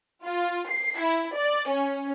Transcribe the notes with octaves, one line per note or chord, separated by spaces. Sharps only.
F4
C7
E4
D5
C#4